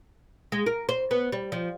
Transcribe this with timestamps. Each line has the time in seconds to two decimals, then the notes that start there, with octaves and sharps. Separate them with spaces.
0.52 G#3
0.66 A#4
0.89 C5
1.11 B3
1.32 G3
1.52 F3